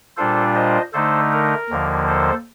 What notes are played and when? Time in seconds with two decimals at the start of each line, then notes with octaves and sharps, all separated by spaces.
0.17 A#2 G3 D4 F4 A4 C5
0.55 C5 D#5
0.93 D3 A3 D#4 A4 C5
1.32 A#4
1.70 D#2 D3 F3 A#3
2.07 A4 C5